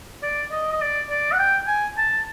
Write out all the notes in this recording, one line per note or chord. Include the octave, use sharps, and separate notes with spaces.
D5
D#5
D#5
D5
D5
F#5
G5
G#5
A5